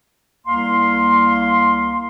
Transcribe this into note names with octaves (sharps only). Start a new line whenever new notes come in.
C2 A#3 F5 C6